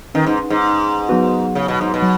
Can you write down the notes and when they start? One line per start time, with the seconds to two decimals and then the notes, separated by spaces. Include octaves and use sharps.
0.14 D#3 C#4 B4
0.27 G#2
0.50 G#2
1.09 F#3 B3 D#4 F#4 B4
1.55 C#3
1.68 B2
1.81 G#2
1.94 B2
2.02 F#3